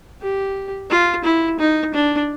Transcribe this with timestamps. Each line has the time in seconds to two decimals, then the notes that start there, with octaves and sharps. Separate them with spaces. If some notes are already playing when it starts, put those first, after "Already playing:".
0.22 G4
0.90 F4
1.24 E4
1.59 D#4
1.94 D4